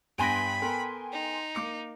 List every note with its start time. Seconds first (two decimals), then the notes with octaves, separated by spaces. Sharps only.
0.18 G2 B3 G5 G#5 B5 C6 A#6
0.62 B3 A4 A#4
1.12 D#4
1.55 A#3 D6 C#7